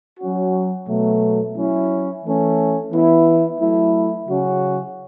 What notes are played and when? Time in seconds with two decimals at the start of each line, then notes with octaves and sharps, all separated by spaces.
0.20 F#3 C#4 F#4
0.88 B2 F#3 A3
1.56 F#3 C#4 E4
2.24 E3 A3 C#4
2.91 E3 B3 E4
3.59 F#3 A3 E4
4.28 C#3 F#3 C#4 F#4